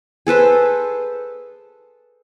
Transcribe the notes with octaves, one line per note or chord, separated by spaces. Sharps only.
G#4 A4 B4 C5